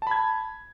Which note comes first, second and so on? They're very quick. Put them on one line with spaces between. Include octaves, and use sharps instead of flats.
A5 B5 G#6